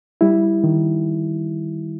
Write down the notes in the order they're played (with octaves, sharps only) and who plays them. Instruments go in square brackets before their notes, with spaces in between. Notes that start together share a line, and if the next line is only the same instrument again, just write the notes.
[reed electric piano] G3 E4
D#3